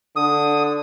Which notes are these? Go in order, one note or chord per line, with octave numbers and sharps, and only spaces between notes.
D3 D#6